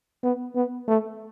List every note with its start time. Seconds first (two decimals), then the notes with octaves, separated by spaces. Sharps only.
0.23 B3
0.56 B3
0.88 A3